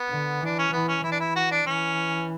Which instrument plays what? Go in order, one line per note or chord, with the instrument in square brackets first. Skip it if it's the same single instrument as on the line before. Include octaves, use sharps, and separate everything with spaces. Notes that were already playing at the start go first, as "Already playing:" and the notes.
Already playing: [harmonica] B3
[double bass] D3
[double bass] E3 [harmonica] D4
[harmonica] C#4
[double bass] E3 [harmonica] B3
[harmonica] C#4
[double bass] E3 [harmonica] E4
[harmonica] D4
E4
F#4
D4
[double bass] E3 [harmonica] C#4